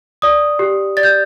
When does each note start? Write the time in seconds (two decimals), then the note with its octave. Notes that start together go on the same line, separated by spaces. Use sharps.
0.22 D5 D#6
0.59 G4
0.97 D5 A6
1.03 G6